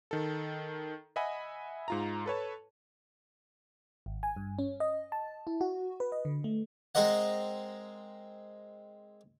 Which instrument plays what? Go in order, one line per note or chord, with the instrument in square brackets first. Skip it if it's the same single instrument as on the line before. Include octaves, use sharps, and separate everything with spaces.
[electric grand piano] D#3 A4
D#5 E5 F#5 G#5 B5
G#2 F4 A#5
A4 B4 C#5 A5
[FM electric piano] G#1
G#5
G2
C#4
D#5
A5
E4
F#4
B4
D#5
D3
A3
[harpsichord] G#3 C4 A#4 D#5 F#5